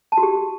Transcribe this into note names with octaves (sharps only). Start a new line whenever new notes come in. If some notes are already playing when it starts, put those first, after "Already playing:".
A5
F#4
G4